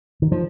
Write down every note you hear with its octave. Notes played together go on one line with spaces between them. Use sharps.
D#3
F3